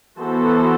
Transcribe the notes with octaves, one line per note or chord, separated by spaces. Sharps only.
E3 B3 F#4 A4 C5